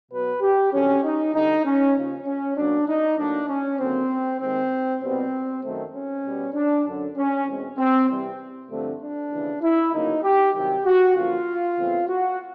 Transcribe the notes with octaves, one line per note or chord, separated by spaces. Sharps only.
B2 F#3 B3 B4
G4
F2 D3 F#3 C#4
D#4
D2 D3 G3 D#4
C#4
D#2 C#3 F3
C#4
B2 F#3 A#3 D4
D#4
A2 F#3 A#3 D4
C#4
D#2 D3 F#3 A#3 C4
D#2 D#3 G#3 C4
C2 B2 G3 B3 C4
F#2 D#3 F#3 A3 C4
C#4
B2 G3 B3
D4
F#2 D3 F#3
C#4
E2 B2 G#3 C4
C4
E2 C3 E3 G3
G2 D3 F3 A3 C4
D4
D#2 C#3 E3
E4
D2 C#3 F#3 A#3 D#4
G4
C2 C3 D#3 F#3 G4
F#4
F#2 D3 F3 A#3 F4
E2 C#3 E3 A3 C4
F#4